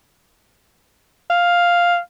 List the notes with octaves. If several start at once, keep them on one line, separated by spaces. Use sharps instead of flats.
F5